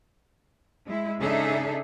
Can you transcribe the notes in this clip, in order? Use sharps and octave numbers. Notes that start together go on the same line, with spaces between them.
G#3 E4
C#3 D4 D#4 G#4 A4 E5